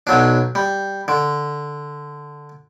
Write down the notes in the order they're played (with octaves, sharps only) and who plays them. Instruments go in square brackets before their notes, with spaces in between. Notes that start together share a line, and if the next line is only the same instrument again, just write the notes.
[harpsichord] B1 F#3 D4
G3
D3